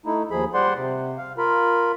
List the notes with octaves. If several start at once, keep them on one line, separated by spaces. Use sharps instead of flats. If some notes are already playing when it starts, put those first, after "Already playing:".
A3 D#4 E4
D#2 F3 G#4 B5
G3 C5 D5 F#5 C6
C3
F5
F4 A#4 B5